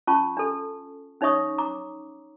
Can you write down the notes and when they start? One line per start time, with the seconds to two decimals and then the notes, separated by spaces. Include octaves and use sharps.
0.07 C#4 F4 A5 C#6
0.37 D4 A4
1.21 C#4 D#4 C#5 E5 C#6 D#6
1.58 A#5 D6